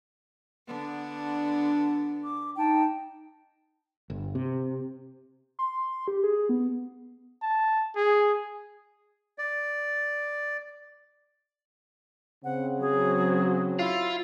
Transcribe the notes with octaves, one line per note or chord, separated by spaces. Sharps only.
D3 B3 D4
D6
D#4 G5 A5
G1
C3
C6
G4
G#4
B3
A5
G#4
D5
C#3 C4 F#5
F#3 G#4
E4 F4